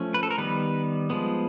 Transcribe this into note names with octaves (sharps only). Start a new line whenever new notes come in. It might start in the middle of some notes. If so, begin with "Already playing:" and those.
Already playing: F3 A3 C#4
B4
A4
A#4
D#3 G3 B3 B4
F3 G#3 B3